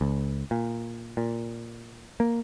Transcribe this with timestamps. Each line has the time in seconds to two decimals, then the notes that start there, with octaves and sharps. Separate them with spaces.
0.01 C#2
0.51 A#2
1.17 A#2
2.20 A#3